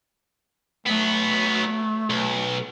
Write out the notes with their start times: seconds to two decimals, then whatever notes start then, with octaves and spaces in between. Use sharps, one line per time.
0.86 F#3 A3 B3
2.10 B1